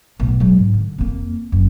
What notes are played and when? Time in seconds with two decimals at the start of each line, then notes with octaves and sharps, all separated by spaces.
0.20 B1 A2
0.40 F#3 G#3
0.59 G#2
0.74 D3
0.98 F2 A#3
1.52 F#1 F#2